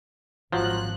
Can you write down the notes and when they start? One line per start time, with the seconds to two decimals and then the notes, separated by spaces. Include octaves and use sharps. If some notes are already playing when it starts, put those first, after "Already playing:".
0.52 G#1 F3 F#3 F#6